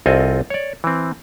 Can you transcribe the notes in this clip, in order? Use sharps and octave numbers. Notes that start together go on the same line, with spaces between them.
C2 C4 F4 A4 D#5 G#5
C#5 D5
E3 C4